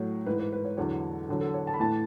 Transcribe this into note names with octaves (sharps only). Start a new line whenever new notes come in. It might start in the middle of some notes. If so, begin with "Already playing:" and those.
Already playing: A2 F#3
G#2 E3 B4
B4
B4
C#5
E2 D3 F#3 C#5
E2 D3 F#3
A4
C#5
A5
B5
A2 E3 A5